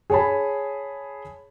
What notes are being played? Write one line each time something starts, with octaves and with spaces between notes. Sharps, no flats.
G#4 C#5 G#5 A5 B5